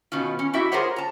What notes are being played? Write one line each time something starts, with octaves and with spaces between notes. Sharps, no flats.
B2 D#3 C#4 F4
C#4
E4 F#4 G4 E5
F4 G#4 A#4 C5 C#5 F#5
A5 A#5